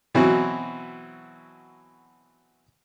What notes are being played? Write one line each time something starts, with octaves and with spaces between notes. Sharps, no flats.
B2 E3 F#3 C4 E4 F#4